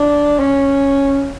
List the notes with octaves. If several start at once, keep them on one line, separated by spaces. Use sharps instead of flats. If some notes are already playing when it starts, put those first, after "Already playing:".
Already playing: D4
C#4